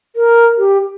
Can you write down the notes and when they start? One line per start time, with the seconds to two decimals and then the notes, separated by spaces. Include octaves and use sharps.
0.16 A#4
0.58 G4